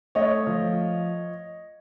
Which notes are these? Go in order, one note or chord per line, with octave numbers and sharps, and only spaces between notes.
A3 C#5 D#5
F3